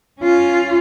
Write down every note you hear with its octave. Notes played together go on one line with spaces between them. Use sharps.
C#4 F4